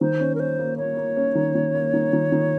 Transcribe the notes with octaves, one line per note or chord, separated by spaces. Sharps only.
D#3 C5
C#4
A#4
C#4 C5
A#3
A#3 C#5
A#3
C#4
D#3
D#3
A#3
D#3
D#3
D#3